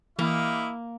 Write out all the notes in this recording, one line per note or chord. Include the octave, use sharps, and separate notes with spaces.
E3 A#3 E4 G4 D#5 F5